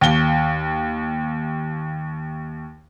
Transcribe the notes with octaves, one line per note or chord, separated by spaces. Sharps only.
D#2 G7